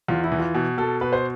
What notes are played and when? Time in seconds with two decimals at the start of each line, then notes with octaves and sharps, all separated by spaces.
0.08 E2 F4
0.24 E4
0.32 E3
0.39 F4
0.54 B2
0.78 B2 A4
1.01 B2 B4
1.13 C5